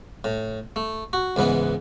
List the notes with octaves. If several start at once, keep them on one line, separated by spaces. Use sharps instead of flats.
A2
A3
F#4
C#2 G#2 E3 B3